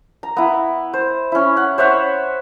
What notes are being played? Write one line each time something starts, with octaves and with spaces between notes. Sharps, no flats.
A#5
B3 E4
C5
C#4 E4
F#5
C5 C#5 E5 F#5